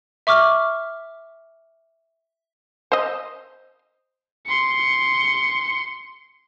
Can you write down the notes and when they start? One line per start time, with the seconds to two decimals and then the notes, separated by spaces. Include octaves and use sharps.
0.27 E5 C#6 D6 F6
2.92 C5 D#5
4.47 C6 C#7